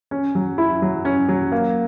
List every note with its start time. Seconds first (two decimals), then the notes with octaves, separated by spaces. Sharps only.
0.11 C#4
0.35 F#3
0.58 E4
0.82 F#3
1.05 C#4
1.29 F#3
1.52 A#3